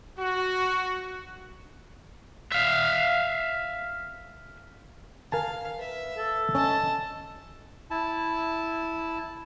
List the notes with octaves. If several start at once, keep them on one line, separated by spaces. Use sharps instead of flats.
F#4
E5 F5
A#4 F5 G#5 A5
B4 E5
A4
C#4 D#5 A5
E4 A5